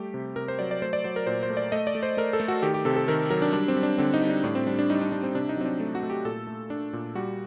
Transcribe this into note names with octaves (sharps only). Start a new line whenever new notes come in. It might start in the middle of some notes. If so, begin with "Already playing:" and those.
Already playing: G3 A3 G4
C3
C3 A#4
C5
F#3 D5
D5
A3 C5
D5
F#3 C5
A#4
A#2 C5
C5
A3
D5
A3 D#5
D5
A3
C5
A3 A#4
A4
A3
F#4
D#3 G4
G4
C3 A4
A4
D#3 A#4
F#3 A#4
D4
G3 D4
C4
G3
D4
D3 C4
D#4
G3
D4
A2 D4
C4
G3 D4
D4
G3 D#4
D4
G3 D4
C4
C3 D4
D#4
F#3 C4
D4
A3
F#4
A3
G4
A#2 A4
A3
A3 D4
A#2
G3 F#4